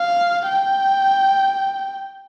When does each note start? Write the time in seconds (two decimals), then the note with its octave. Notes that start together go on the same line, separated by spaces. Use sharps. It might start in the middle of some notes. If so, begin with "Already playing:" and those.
Already playing: F5
0.48 G5